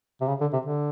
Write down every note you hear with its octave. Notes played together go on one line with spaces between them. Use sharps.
C3
C#3
D3
C3
D3